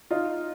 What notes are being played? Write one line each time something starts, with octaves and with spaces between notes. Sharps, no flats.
D#4 F4